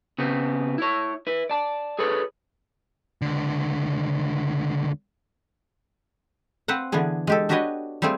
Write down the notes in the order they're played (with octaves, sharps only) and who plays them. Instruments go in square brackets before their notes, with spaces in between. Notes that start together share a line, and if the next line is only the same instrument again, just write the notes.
[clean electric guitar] C#3 B3 C4
E4 C#5
E4 B4
D5 A5
G#4 A4 B4 C#5
[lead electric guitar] C#2 D3
[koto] C4 B4 C5 F5 F#5
D3 E3 B3 D4 G#4
G#3 G4 A4
D4 F#4 G4 B4 C#5 D#5
G3 A3 C4 F4 G#4